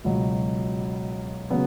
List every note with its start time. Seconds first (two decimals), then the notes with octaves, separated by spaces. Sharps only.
0.04 C#2 B2 F#3
1.50 C#3 F#3 B3